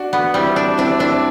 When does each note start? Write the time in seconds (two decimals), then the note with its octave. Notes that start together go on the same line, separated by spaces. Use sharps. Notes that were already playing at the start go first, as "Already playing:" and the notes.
Already playing: D4 F#4
0.13 B3
0.34 G3 C4 E4
0.56 D4
0.77 C4 D4 E4
0.99 C4 D4 E4